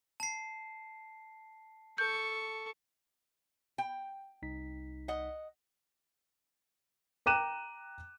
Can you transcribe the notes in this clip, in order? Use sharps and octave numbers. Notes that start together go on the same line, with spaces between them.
A5 C7
A4 C#6 G6
G5
C2 D#4 B6
D#5 F#5
G5 A#5 D6 F#6 D#7 E7